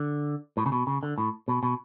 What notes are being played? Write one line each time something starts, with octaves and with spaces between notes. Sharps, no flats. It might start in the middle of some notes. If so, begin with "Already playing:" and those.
Already playing: D3
A2
C#3
B2
C#3
D3
A2
B2
B2